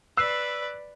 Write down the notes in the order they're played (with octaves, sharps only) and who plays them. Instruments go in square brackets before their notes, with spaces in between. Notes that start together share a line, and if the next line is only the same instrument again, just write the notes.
[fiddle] B4 D5 [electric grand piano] E6 F#6 C7